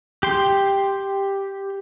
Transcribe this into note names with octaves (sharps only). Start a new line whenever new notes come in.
G4 C6